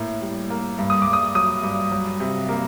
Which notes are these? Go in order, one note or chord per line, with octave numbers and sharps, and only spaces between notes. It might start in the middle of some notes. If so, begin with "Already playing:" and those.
Already playing: A2 A#3
G3
A#3
G2
D#6
G2 D6
D#6
F#3 D#6
G2
F#3
C3
A#3